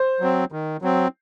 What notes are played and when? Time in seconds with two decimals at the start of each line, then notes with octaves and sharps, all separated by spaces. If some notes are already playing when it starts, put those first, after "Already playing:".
Already playing: C5
0.20 F#3 C4
0.52 D#3
0.82 F#3 C4